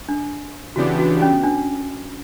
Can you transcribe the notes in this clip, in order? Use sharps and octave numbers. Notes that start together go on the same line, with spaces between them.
D4
C#3 E3 B3 D4 F#4 G4
F#4
C#4
D4